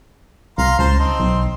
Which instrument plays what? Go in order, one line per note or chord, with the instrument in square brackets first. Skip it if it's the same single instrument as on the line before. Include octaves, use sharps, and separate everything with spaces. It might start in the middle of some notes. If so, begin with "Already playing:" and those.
[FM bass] C2 [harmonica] F5 A#5 C6
[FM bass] C#2 [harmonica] C5 A5 C6
[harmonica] C4 D#4 C6
[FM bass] B1